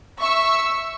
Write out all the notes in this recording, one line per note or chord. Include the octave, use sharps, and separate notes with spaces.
E5 C#6 E6